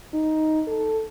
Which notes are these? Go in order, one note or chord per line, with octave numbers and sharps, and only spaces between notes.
D#4
A4